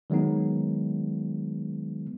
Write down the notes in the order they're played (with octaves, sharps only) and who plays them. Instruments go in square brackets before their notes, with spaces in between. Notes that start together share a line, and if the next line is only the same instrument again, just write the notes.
[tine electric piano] D#3 F#3 G#3 B3 D#4